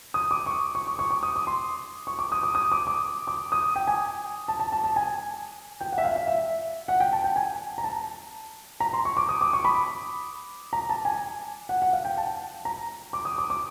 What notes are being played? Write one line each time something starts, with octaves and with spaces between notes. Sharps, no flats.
D#6
D6
C#6
C#6
C#6
C#6
D6
D#6
D6
C6
C#6
D6
D#6
D6
D#6
D6
D6
D6
D#6
G5
G#5
A5
A5
A5
A5
G#5
G5
F#5
E5
F5
E5
E5
F#5
G5
A5
G5
G#5
A#5
A5
A#5
C6
C#6
D6
D#6
D6
C#6
B5
A#5
A5
G#5
F#5
F#5
F5
G5
A5
A#5
D6
D#6
D6
D6